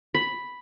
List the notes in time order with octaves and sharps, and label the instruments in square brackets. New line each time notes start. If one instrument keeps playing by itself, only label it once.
[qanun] B5